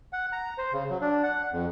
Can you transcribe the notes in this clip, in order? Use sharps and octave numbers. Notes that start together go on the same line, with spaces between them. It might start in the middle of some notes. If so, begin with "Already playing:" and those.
F#5
A#5
C5
C#3
F#3
D4
F#5
F2